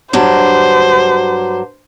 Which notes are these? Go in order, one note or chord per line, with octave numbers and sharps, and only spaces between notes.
G2 F#3 D4 C5